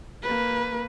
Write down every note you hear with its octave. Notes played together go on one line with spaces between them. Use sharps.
A#3 B4